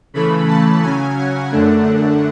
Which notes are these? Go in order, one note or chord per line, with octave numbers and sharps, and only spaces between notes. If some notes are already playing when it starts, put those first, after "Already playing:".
C#3 E3 A3 B5
A5
C#3 F#3 C#4 G#5
F#5
F#2 D3 A3 D4